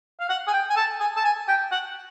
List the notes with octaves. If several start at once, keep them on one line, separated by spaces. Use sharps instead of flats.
F5
F#5
G#5
G5
G#5
A5
G#5
A5
G#5
G5
F#5